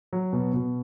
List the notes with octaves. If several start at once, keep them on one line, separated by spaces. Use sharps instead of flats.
F#3
B2
B2